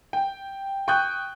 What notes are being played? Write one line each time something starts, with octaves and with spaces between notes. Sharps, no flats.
G5
G5 C#6 D#6 F#6 G6